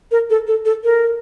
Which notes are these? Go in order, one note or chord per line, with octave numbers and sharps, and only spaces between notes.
A#4
A4
A4
A4
A#4